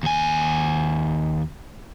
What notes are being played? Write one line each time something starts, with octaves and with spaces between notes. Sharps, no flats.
D#2 G#5